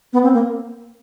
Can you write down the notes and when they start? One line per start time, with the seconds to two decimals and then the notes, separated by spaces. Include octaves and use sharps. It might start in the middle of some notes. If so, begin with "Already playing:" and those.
0.13 B3
0.23 C4
0.33 A#3